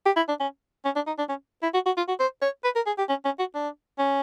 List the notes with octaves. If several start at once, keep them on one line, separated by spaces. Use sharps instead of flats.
G4
E4
D4
C#4
C#4
D4
D#4
D4
C#4
E4
F#4
F#4
F4
F#4
C5
C#5
B4
A#4
G#4
G4
C#4
C#4
F#4
D4
C#4